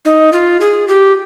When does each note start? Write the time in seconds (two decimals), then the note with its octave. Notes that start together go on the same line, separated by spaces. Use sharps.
0.05 D#4
0.33 F4
0.61 G#4
0.88 G4